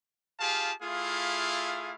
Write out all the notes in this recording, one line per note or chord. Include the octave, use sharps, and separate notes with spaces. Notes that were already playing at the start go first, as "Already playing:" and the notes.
F4 G4 G#4 F5 A5
A3 E4 F4 G#4 F5